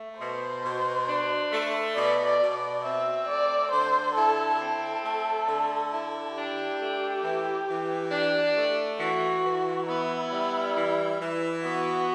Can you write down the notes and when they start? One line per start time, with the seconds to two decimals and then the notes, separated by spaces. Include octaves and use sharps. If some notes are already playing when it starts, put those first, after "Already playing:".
Already playing: A3
0.20 B2 C5
0.63 B2
1.08 D4
1.52 A3
1.96 B2 D5
2.26 D5
2.40 B2
2.54 D5
2.84 C4 E5
3.28 A3 D5
3.72 D3 C5
4.15 E4 A4
4.59 C4 A4
5.04 A3
5.48 D3
5.92 E4
6.35 D4 G4
6.80 A3
7.23 E3
7.68 E3
8.11 D4
8.56 A3
8.99 E3 F#4
9.44 E3
9.88 B3 E4
10.31 G3
10.76 E3
11.20 E3
11.64 B3 F#4